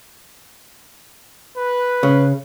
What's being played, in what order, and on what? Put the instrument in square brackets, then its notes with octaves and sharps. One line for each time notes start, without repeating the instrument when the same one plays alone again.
[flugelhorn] B4
[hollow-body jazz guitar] C#3